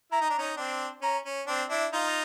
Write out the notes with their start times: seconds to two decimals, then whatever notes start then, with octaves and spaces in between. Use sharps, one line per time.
0.11 E4 A#5
0.21 D#4
0.30 D4
0.38 C#4 D#4
0.56 C4 D4
1.02 C#4 A#5
1.26 C#4
1.47 C4 D4
1.70 D4 E4
1.92 D#4 F4